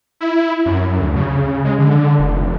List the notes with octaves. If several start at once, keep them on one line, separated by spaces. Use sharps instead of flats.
E4
F#2
D2
C#3
G#3
D3
F1